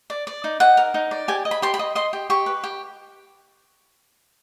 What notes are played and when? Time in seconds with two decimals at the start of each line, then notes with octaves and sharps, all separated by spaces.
0.10 D5
0.27 D5
0.44 D#4
0.60 D#4 F#5
0.77 A#4
0.94 D#4
1.11 D5
1.28 G4 G#5
1.45 D#5
1.51 B5
1.62 G4 C6
1.74 B5
1.79 D#5
1.95 D#5 C6
2.13 G4
2.30 G4 C#6
2.46 B4
2.64 G4